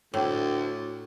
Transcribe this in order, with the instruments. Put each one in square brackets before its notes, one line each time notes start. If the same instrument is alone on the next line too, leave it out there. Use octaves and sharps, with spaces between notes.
[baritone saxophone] D2 [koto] A2